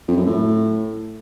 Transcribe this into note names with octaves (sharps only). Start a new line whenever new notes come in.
F2
F#2
A2